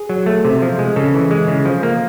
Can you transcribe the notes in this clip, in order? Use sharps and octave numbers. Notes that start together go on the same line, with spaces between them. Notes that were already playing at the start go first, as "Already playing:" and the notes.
Already playing: G#4
F#3
A3
C3
F3
G#3
C#3 A4
E3
G#3
C#3
F3
A#3